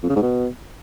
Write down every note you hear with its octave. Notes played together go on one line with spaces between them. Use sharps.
F2
C#3
G#2
B2